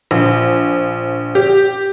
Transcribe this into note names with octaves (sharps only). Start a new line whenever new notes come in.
A#1
G4